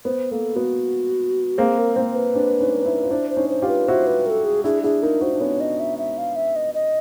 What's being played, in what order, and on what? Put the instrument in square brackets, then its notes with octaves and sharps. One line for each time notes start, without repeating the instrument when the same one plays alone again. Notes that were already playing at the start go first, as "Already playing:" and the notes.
[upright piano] B3 [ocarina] C5
[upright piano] A#3 [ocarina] A4
[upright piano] B3 [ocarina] F#4
[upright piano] A#3 C4 [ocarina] G#4
[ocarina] A#4
[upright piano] A#3 C4 [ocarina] C5
[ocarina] B4
[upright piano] C4 D4
C#4 D#4
D4 E4
F4
[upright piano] D4 E4 [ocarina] C5
[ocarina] C5
[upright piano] C#4 D#4
[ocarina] C5
[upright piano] F4 G4
[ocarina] B4
[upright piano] E4 F#4 [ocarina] C5
[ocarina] B4
A#4
A4
G#4
[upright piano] D4 E4 [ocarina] G#4
[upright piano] D4 E4 [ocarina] G#4
[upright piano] D#4 F4 [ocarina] A#4
[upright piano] E4 F#4 [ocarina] C5
[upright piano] D4
[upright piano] B3 C#4 [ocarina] C#5
[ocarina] D#5
E5
E5
F5
E5
D#5
D#5